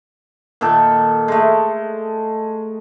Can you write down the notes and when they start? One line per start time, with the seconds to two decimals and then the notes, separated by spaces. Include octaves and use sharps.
0.61 A#2 D#3 A4 G5
1.28 G#3 A3